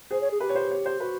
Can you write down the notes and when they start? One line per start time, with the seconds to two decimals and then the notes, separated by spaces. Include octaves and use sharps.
0.11 G#4 C5
0.20 C#5
0.30 G#4
0.40 G4 B4
0.50 C#5
0.55 C5
0.71 C#5
0.86 C5
1.00 F#4 B4